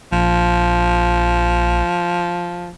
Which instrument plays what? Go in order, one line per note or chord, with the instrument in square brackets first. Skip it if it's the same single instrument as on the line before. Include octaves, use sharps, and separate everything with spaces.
[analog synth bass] A#1 [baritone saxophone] F3